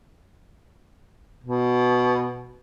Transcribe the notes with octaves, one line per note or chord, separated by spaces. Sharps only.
B2